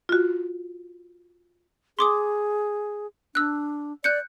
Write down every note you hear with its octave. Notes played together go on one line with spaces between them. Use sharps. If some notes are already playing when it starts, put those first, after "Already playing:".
F4 F#4
G#4 C6 D6 D#6
D4 E6 F#6
D5 F#6 G6 C#7